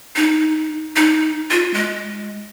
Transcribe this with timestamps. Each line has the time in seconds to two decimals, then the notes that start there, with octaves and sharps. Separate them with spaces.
0.16 D#4
0.96 D#4
1.51 F4
1.74 G#3